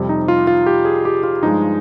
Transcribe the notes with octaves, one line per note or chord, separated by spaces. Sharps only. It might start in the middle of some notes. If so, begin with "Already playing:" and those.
Already playing: F2 C3 G3
D#4
F4
F4
G4
G#4
G4
F4
G2 F3 G#3 D#4